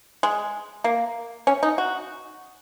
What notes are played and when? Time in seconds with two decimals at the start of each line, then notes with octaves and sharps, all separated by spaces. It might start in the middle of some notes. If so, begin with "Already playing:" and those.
0.23 G#3
0.84 A#3
1.47 C#4
1.63 D#4
1.78 F#4